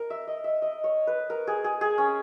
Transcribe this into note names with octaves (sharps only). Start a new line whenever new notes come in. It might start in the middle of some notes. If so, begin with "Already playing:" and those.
Already playing: A#4
E5
D#5
E5
D#5
C#5
B4
A#4
G#4
G#4
G#4
C#4